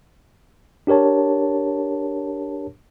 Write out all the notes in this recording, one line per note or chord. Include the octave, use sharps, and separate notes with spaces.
D4 G4 A#4 C#5 A5